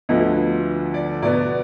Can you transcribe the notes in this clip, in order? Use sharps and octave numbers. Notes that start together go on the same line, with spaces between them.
D2 D3 F3 B3 D#5
D5
B2 B3 D5